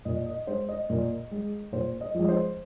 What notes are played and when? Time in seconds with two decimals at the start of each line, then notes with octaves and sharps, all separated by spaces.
0.05 A#2 D#5
0.26 D#5
0.47 G#3 C5
0.69 D#5
0.90 A#2
1.31 G#3
1.72 A#2 C5
2.01 D#5
2.14 F3 G#3
2.24 D#5
2.29 C5